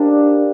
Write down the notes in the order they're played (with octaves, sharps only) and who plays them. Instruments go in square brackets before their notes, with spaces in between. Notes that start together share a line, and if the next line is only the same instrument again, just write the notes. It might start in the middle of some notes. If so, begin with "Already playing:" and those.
Already playing: [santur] A#3 D#4 G4 C5 [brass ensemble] D4